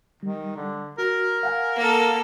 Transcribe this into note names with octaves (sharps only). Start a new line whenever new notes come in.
D#3 G3
D3
F#4 A#4
F5 F#5 G#5
A#3 A4